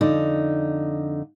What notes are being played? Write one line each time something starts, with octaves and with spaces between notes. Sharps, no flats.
F2 D3 D#4